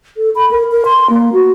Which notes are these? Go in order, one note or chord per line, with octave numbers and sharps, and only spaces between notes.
A4
B5
A#4
A#4
C6
A#3
F#4